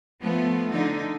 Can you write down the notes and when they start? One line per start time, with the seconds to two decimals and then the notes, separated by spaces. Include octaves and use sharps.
0.22 F3 A3 B3
0.71 D3 D#4